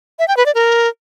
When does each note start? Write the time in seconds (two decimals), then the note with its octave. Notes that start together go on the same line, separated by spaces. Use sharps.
0.19 E5
0.28 G5
0.37 B4
0.46 D5
0.55 A#4